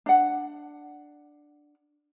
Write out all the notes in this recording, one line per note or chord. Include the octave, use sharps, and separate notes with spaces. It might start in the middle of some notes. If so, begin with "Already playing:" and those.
D4 F#5